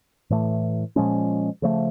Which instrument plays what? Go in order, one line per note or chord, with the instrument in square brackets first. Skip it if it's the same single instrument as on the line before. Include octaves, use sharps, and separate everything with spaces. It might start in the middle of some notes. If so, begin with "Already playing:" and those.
[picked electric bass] A2 E3 A3
A#2 F3 G#3 C#4
C#3 F3 A3